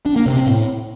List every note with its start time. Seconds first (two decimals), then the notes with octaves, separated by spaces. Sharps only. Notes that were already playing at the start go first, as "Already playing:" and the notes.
0.06 D4
0.16 A#3
0.26 C3
0.36 C4
0.47 A2